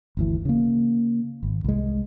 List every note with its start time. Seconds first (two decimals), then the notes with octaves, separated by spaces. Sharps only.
0.17 G1 D2 E3
0.45 C#3 A#3
1.43 G#1
1.64 C2 G#3